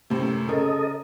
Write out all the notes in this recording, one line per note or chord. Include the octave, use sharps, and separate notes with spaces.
F#2 A2 C3
C#3 A4 A#4 D#5